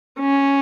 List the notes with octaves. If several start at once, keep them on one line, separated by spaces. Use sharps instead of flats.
C#4